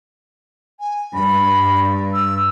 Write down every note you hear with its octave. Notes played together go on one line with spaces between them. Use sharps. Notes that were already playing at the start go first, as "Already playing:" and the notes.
G#5
G2 B5
E6